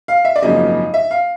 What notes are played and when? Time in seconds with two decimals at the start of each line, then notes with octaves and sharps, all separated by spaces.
0.08 F5
0.25 E5
0.36 D5
0.42 G#1 F#2 C#3 F3 A#3 D#5
0.94 E5
1.11 F5